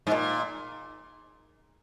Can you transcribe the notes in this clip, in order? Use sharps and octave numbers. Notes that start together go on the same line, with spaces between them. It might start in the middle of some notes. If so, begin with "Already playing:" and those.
G#2
A#2